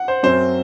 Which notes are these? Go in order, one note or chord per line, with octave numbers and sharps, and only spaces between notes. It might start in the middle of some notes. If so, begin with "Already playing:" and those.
Already playing: F#5
C5
F#2 F#3 C4 C5